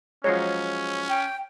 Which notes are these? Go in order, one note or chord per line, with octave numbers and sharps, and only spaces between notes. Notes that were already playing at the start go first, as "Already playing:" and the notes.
F3 F#3 G#3 C#4 C#5 A#5 C6
G5